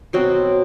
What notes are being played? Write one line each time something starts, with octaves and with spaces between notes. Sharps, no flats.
B2 F#3 C4 F#4